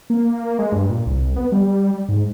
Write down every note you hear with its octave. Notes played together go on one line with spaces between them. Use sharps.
A#3
G#3
G2
A#2
C2
B3
G3
G#2